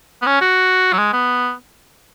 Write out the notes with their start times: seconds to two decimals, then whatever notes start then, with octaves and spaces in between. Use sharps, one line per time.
0.22 B3
0.27 C#4
0.41 F#4
0.93 F#3
0.99 G#3
1.13 B3